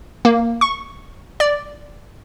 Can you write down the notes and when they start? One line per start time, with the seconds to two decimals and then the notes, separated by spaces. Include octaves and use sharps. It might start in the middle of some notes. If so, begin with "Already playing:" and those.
0.25 A#3
0.61 C#6
1.40 D5